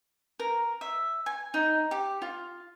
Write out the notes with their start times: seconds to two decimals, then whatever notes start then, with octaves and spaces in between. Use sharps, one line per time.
0.40 A#4
0.81 E5
1.26 G#5
1.54 D#4
1.91 G4
2.22 F4